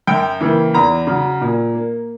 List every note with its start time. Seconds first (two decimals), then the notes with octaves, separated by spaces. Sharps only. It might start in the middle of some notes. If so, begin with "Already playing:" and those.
0.07 F#2 G5
0.40 C#3 E3 A#3
0.74 E2 A#5
1.07 C#3 F#3
1.41 A#2
1.74 A#3